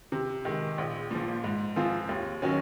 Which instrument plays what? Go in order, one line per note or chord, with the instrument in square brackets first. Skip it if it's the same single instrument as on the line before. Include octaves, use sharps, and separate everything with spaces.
[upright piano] C3
D#3 G#3
A#1
A#2 F3
G#2
F3 C4 F4 G#4
D#2
D#3 F#3 C#4